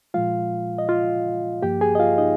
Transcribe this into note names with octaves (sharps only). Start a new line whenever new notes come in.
A#2 F3 G#3 F4 F5
D#5
F4 F5
G2 F3 A#3 G4 G5
G#4 G#5
D#5
F4 F5
D#4 D#5